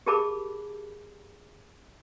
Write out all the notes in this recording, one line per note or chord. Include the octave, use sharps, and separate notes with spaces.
G4 G#4 A#4 A5 B5 D6